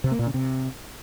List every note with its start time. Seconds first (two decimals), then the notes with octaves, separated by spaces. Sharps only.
0.04 C3
0.12 A#3
0.19 A#2
0.27 C#3
0.34 C3